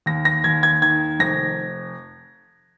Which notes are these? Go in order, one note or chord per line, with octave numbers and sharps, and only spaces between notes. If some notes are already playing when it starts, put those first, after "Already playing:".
D#2 A#6
A#6
D#2 G#6
G#6
D#3 G#6
F1 A#6